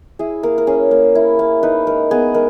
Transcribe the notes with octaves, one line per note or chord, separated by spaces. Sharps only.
E4 G#4
A#3 A#4
A#4
C#4 G#4
A#3
E4
A#3
D#4 B4
G#3 A#4
B3 G#4
G#3 A#4